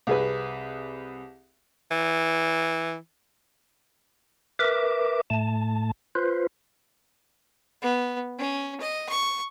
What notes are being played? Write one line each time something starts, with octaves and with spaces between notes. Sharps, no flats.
C2 G#4 B4
E3
A#4 B4 E5 D6
A2 A3 A5
F4 B4 C5
B3
C#4
D#5
C#6